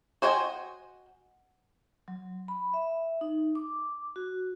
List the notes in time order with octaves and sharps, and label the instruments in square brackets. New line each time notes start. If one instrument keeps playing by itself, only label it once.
[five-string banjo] F#4 C5 D#5 G5 G#5
[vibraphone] F#3
B5
E5
D#4
D6
F#4